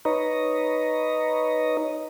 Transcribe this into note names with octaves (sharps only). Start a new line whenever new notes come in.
D#4 B4 C#5 D#5 A#5